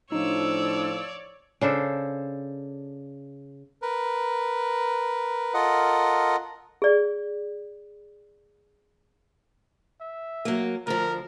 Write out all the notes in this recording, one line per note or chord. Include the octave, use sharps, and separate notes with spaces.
A2 F3 D4 D#4 C#5 D5 E6
C#3 D4 A4 C5
A#4 B4
F4 A4 A#4 D#5 F#5
G#4 D5
E5
F#3 A#3
D2 F3 A#4